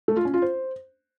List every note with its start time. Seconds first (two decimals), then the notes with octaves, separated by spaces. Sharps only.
0.08 A3
0.17 F4
0.25 C#4
0.34 F4
0.42 C5